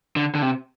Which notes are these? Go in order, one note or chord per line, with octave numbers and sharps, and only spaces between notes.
D3
D3
C3